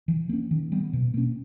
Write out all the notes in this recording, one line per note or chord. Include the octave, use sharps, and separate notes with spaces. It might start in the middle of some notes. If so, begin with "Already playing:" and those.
E3
A#3 C#4
D#3
G3 B3
B2
A#3 C#4